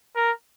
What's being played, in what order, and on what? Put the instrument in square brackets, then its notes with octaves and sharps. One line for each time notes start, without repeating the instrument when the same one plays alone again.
[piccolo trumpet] A#4